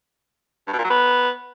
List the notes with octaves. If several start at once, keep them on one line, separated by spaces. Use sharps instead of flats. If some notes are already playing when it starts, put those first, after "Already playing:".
G2
B2
A#2
F#3
B3